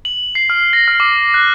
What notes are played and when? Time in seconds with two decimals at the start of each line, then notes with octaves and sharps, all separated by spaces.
0.05 F#7
0.35 C7
0.50 F6
0.73 A#6
0.88 F6
1.00 D6
1.34 F#6